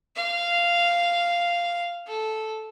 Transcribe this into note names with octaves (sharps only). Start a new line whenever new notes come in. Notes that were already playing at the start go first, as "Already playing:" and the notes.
F5
A4